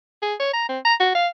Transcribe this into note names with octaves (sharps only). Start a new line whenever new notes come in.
G#4
C#5
A#5
C4
A#5
F#4
F5